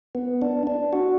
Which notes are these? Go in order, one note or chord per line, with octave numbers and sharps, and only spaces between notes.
B3
D4
D4
F#4